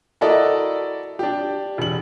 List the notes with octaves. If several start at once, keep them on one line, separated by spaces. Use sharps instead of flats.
E4 F#4 A4 A#4 D5 D#5
D4 G4
E1 F#7